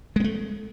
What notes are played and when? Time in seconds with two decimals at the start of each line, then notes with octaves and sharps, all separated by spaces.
0.16 G#3
0.20 B3
0.24 A3